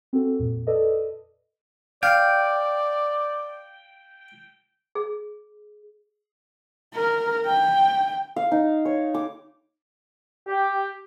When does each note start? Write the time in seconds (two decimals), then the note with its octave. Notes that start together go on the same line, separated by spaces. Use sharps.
0.13 C4 F#4 A4
0.39 F2 A#2
0.67 A4 B4 D5 D#5
2.03 D5 F5 G5
4.95 G#4
6.95 A#4
7.46 G5
8.36 F5
8.52 D#4
8.85 C#5
9.14 D6
10.47 G4